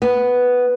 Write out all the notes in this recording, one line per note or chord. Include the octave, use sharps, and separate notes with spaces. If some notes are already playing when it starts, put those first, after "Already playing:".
B3